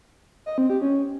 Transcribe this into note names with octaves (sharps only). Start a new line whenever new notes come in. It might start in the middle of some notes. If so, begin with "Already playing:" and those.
D#5
C4
G4
C#4